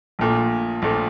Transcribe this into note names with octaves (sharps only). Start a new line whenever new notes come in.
A#1 A#2 A3
A#1 A#2 A3